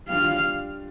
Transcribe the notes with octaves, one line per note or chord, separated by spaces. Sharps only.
G3 D4 F4 F5